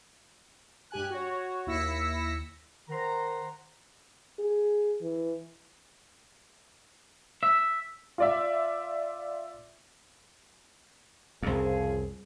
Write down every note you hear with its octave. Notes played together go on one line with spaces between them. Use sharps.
G2 G4 G#5 F#6
F#4 C#5
D#2 E4 E6 A#6 B6 C#7
D#3 C5 F#5 A#5
G#4
E3
E5
F4 D5 E5
C2 F2 C#3 F3 G#4